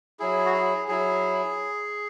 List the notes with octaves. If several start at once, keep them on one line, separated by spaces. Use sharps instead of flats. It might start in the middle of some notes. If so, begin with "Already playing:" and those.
F#3 E4 G#4
F#4
G#4
F#3 E4 G#4